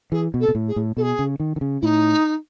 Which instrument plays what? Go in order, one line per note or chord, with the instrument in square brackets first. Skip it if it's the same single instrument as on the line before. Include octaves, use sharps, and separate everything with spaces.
[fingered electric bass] E3 [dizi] G#4
[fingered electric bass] B2
[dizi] A4
[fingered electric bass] B2
A2
[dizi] G#4
[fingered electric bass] A2
[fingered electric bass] B2 [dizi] A4
[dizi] G#4
[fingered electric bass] C#3
D#3
D#3
C#3
[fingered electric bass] A2 [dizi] D#4 E4